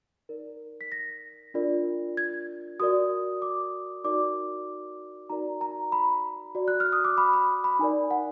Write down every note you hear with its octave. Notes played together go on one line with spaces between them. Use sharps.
D#4 A#4 D5
B6
A#6
D4 F4 A#4 D5
G#6
F#4 A#4 D5 D#6
D6
D#4 F#4 A#4 D5 D6
D#4 F#4 A#4 D5 A#5
A#5
B5
F#4 D5
F#6
F6
D#6
D6
B5
B5
B5
D#4 A#4 D5 G#5
F#5